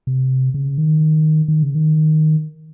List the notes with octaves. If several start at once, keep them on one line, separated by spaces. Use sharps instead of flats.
C3
C#3
D#3
D#3
C#3
D#3